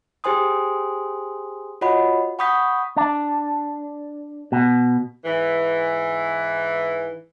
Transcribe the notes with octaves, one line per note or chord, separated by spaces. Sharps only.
G4 G#4 C5 G#5 C6 D#6
F4 F#4 C#5 D#5 F#5 B5
F#5 B5 C#6 D#6 G6 B6
D4
B2
G#2 E3